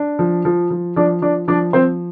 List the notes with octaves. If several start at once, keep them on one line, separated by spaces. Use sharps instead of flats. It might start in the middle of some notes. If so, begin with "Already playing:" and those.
Already playing: D4
F3
F3
F3
F3 D4 D5
F3 D4 D5
F3 D4 D5
F3 C4 C5